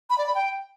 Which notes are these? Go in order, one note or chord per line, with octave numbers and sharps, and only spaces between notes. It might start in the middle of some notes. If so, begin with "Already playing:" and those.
B5
D5
B5
G5